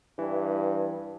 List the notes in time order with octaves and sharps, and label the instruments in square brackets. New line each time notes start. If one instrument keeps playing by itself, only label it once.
[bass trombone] G2 [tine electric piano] E3